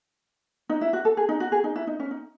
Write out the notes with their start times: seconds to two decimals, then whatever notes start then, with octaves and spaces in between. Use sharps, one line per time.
0.70 D#4
0.81 E4
0.93 F#4
1.05 A4
1.17 G#4
1.29 D#4
1.40 F#4
1.52 G#4
1.64 D#4
1.76 E4
1.87 D#4
2.00 C#4
2.11 D#4